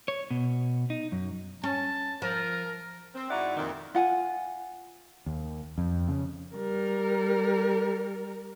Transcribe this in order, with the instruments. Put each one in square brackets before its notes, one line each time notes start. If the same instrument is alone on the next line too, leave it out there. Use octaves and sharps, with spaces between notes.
[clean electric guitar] C#5
B2
D#4
F#2
[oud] C#4 [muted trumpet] A5
[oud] F3 [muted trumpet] A#4
[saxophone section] C4
G#2 D#4 E4 F#4 D5 F#5
F2 A#2 D#3
[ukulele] F4 F#5 G#5
[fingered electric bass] D#2
F2
C#3
[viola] G3 A#4